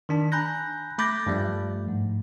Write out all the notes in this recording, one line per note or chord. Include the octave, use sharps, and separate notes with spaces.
D#3 D4 A5
G#5 A#5 B5 F#6 G6 A#6
A3 B5 D6 G6 A6 A#6
G2 F3 G3 A3
G#2